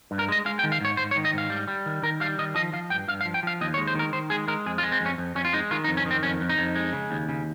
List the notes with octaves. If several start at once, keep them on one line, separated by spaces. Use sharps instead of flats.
G2
A#4
G#3 D#5
G#3 F5
G5
D#3
F5
G#2 C#5
G#2 C5
C#5
D#3
D#5
G#2 F5
G3
G3
D#3
D#3 A#4
G3 F5
D#3 D#5
F3 D#5
F3 F5
G2 G5
G2 F5
F5
F3
G5
F3 F5
D#2 D#5
C#5
G#3
C5
D#3 A#4
D#3 C5
G#3 G#4
G#3 A#4
F2 G#4
F4
G#3
C4
F2 C#4
F2
F2 C#4
F4
G#3 D#4
D#3 F4
D#4
F2
C#4
D#3 C4
F2 C#4
F2
D#4
F2
G#3
C#3
D#2
C#3